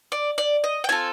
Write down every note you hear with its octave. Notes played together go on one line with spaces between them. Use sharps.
D5
D5
D#5
G5
C4 F4 A4 G#5